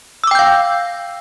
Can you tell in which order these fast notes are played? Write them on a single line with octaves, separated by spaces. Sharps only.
E6 D6 G5 G6 F5